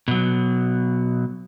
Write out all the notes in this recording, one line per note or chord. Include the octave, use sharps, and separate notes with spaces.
B2 F#3